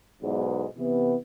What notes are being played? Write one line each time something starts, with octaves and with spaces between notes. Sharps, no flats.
B1 E2 G#2
C3 E3 B3